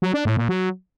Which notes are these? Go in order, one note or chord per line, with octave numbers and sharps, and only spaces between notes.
F#3
D4
A2
A#2
F#3